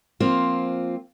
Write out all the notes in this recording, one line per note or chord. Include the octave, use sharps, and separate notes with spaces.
F3 A#3 C4 F4